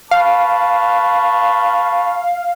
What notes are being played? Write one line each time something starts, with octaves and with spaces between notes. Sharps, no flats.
B4 F5 A5 C#6